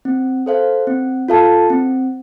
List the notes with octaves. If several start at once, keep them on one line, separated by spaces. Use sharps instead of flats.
C4
A4 C5 F5
C4
F4 A4 F5 A5
C4